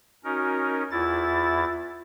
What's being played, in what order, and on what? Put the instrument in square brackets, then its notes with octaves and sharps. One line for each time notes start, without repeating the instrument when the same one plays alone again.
[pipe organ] C#4 D#4 A#4 [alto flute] F#4
[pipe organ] E2 E4 A6 [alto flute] F4